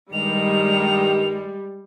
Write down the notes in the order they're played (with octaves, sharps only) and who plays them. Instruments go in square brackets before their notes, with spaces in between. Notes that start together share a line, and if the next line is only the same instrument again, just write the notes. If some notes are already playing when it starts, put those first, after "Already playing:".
[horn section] G2 D#3 [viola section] G3 [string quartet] G#3 [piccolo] F7